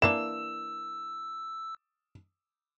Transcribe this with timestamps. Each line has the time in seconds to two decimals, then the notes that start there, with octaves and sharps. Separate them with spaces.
0.02 E3 A#3 D4 E6 E7